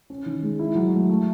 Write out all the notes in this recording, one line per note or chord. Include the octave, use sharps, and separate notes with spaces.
C#4
D#3
G#3
E4
F#3
A3
A3